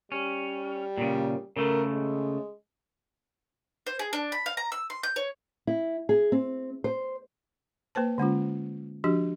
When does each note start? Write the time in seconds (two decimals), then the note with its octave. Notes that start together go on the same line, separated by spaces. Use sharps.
0.12 G3 C#4
0.98 A#2 C#3
1.57 C#3 A3 A#4
1.93 G#3
3.87 C5
3.99 G#4
4.13 D4
4.32 B5
4.46 F5
4.57 A#5
4.72 E6
4.90 C6
5.03 G6
5.16 C#5
5.67 E4
6.09 G#4
6.32 C4
6.84 C5
7.95 A#3 B4 C5 A5
8.18 D3 G#3 C#4 F4
9.04 F3 D4 F#4 G4